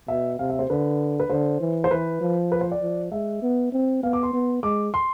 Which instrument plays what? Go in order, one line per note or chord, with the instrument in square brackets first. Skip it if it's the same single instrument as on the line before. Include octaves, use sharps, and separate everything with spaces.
[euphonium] B2 [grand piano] E5
[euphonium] C3 [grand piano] F5
[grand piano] E5
C5
[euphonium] D3 [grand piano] B4
[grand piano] B4
[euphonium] D3 [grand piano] C5
[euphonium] E3
[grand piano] C5
[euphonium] E3 [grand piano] B4
[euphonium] F3
[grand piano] B4
C5
D5
[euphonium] F3
[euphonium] G#3 [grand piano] E5
[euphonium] B3
C4
[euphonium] B3 [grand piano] F5
[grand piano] D6
C6
[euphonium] B3
[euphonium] G#3 [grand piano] D6
[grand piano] C6